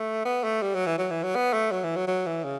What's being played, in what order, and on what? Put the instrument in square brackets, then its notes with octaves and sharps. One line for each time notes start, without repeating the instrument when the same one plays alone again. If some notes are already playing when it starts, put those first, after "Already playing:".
Already playing: [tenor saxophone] A3
B3
A3
G3
F#3
E3
F#3
E3
F#3
B3
A3
F#3
E3
F#3
F#3
E3
C#3